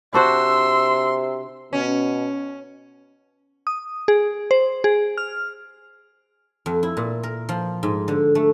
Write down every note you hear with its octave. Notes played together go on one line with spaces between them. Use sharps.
C3 D4 F#4 C5 C6 E6
B2 C#4
D#6
G#4
C5
G#4
F6
F2
E4
A#2
A#4
F3
G#2
D3
A3